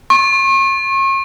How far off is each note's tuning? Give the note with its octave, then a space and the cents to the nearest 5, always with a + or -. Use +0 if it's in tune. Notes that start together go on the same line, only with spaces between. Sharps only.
C#6 -40